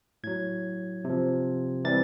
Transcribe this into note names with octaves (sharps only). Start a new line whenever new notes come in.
A2 F#3 G#6
C3 F3
C3 E3 G3 A6